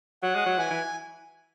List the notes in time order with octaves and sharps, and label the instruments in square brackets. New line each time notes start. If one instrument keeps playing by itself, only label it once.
[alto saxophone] F#3 [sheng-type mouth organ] F#5
[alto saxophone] G#3
F#3
[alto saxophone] E3 [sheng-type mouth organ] G#5
[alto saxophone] E3